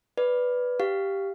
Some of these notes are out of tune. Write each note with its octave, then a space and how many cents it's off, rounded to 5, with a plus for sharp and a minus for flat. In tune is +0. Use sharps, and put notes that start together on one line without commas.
B4 +0 D5 +0
G4 +0 F5 -5